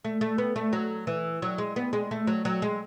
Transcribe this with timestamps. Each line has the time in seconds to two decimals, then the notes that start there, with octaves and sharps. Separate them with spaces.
0.05 A3
0.21 A3
0.38 B3
0.56 A3
0.73 F#3
1.07 E3
1.42 F#3
1.58 G#3
1.76 B3
1.93 G#3
2.11 A3
2.27 F#3
2.45 F#3
2.62 G#3